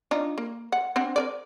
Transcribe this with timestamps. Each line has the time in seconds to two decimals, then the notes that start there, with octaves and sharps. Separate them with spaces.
0.11 D4 D#4 F4
0.38 A#3
0.72 F#5
0.96 C4 D4 F#5
1.16 A#4 B4 D5